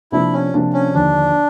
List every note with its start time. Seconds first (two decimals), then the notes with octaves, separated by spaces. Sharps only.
0.12 C3 F3 A#3 D4 E4 F4
0.33 C#4
0.54 C3 F3 A#3 D4 F4
0.73 C#4
0.94 D#2 D3 F3 D4